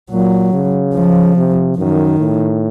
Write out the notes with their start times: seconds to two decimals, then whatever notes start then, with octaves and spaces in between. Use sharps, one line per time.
0.11 A#2 F#3
0.53 C#3
0.95 F3
1.36 C3
1.78 F#2 D#3
2.19 A2